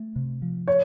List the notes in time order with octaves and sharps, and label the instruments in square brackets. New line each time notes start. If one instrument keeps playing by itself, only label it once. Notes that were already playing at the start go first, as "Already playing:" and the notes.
Already playing: [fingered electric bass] A3
C3
F3
[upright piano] C#5